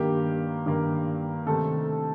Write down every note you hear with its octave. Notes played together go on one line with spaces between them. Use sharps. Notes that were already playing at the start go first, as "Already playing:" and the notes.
Already playing: G2 D#3 A#3 G4
G2 D#3 A#3
C3 D#3 A3 C4 A4